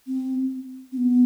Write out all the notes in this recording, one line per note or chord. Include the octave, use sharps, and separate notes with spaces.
C4
C4
B3